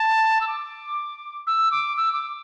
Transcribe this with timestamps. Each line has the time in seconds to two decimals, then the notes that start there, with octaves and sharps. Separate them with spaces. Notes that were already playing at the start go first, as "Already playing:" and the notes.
Already playing: A5
0.41 E6
0.47 D6
1.47 E6
1.71 D6
1.97 E6
2.13 D6